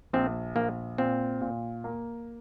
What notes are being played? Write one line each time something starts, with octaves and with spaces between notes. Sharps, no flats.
A#1 C4
A#1 A#3
A#2 C4
A#2
A#3